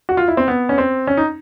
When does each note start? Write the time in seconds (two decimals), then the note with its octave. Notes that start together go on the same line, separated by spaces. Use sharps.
0.09 F#4
0.17 F4
0.28 E4
0.37 C4
0.48 B3
0.69 C#4
0.78 C4
1.07 C#4
1.17 D#4